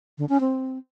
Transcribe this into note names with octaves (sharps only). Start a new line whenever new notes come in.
D3
C#4
C4